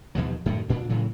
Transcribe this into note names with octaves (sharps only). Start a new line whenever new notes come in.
D#2 B2 F3 F#3
F#2 A2 D3 D#3
D2 A#2 D4
A2 C#3 E3 F#3